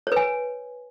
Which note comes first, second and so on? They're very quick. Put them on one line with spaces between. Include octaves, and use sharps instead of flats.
C#5 B4 G#5